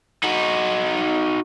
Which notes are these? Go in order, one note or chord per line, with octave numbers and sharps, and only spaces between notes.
D#4 F#4